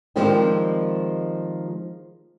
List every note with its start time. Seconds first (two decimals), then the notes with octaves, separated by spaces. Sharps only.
0.16 D#3 F3 G3 G#3 C4